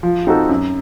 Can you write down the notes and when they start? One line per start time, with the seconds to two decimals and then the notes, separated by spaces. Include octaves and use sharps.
0.03 F3
0.27 C4 D#4 F#4 A4
0.49 F#2